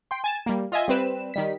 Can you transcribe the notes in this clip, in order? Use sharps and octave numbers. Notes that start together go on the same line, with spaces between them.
G5 C6
G#5 A6 E7
G3 A#3
F4 D#5 E5 G#5
G3 C4 B4 E7
D#3 G3 B6